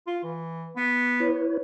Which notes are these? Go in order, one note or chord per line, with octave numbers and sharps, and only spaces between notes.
F4
E3
B3
E4 B4 C#5